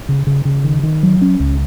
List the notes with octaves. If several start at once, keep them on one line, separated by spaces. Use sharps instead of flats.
C#3
C#3
C#3
D#3
D#3
F#3
C#4
C#2